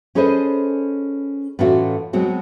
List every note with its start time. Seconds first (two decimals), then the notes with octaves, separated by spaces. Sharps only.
0.15 C#4 G#4 A4 B4 C5 D#5
1.59 A2 E3 A3 C#4 F4 F#4
2.13 B2 F#3 G#3 C4